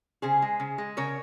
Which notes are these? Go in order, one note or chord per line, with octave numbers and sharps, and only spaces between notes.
C#3 G#4 C5
G#3
C#3
G#3
C#3 A#4 C#5